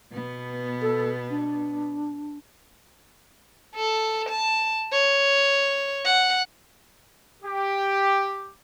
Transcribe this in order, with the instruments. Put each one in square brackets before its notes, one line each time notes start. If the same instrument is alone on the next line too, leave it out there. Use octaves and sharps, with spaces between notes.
[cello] B2 B3
[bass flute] A4
D4
[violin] A4
A5
C#5
F#5
[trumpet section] G4